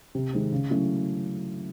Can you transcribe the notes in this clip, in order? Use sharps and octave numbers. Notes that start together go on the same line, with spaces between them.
C3
D#3 G#3 C4
C#3
F#3 A3 C#4 E4